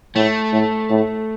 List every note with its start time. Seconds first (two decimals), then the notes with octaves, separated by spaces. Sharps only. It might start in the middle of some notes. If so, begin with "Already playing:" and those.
0.16 A2 A3
0.53 A2
0.90 A2